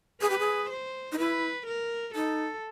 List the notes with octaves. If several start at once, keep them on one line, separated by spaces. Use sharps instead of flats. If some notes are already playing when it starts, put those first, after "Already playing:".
G#4 B4
G4
G#4
C5
D#4
E4 B4
A#4
D#4 A4